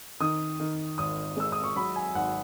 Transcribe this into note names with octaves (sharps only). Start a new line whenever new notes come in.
D#3 D#6
D#3
G#1 D#6
G#3 E6
D#6
C#6
F#3 B5
G#5
G#1 F#5